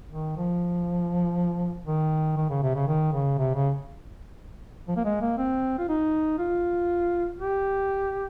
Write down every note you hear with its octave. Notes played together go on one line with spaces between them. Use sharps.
D#3
F3
D#3
D#3
C#3
C3
C#3
D#3
C#3
C3
C#3
F3
A#3
G#3
A#3
C4
F4
D#4
F4
G4